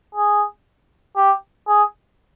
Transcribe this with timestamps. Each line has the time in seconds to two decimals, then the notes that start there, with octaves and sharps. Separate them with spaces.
0.15 G#4
1.16 G4
1.68 G#4